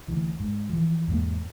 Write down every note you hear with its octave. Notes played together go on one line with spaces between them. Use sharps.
D2 E3
G#2
E3 F3
E2 G#2 G#3 A#3